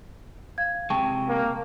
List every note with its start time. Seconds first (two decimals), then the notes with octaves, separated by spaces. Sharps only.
0.58 F5 G#6
0.90 C3 G#3 G5 A5 C#6
1.29 A#3